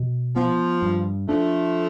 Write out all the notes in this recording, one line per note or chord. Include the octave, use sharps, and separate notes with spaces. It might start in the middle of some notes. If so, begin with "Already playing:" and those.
Already playing: B2
F3 B3
G2
F3 A3 D4